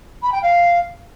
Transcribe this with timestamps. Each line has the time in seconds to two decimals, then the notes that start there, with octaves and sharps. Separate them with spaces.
0.22 B5
0.32 G5
0.42 F5